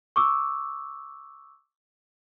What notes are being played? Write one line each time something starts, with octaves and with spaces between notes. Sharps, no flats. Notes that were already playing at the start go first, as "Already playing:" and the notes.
C#6 D6 E6